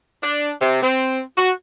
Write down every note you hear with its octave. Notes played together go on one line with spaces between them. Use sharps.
D4
C3
C4
F#4